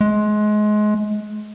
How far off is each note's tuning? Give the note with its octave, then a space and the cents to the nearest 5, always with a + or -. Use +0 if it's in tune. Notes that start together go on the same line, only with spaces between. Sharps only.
G#3 +25